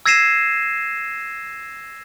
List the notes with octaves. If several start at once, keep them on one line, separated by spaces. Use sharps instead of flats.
E6 G#6 A#6 C7 D#7 E7